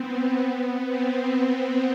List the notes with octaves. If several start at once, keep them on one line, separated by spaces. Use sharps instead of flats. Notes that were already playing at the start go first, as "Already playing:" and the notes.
Already playing: B3 C4
C4